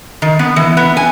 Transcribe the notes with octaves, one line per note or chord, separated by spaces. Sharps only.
D#3
B3
E3
B3
G#5